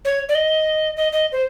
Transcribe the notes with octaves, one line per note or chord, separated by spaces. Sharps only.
C#5
D5
D#5
D#5
D#5
C5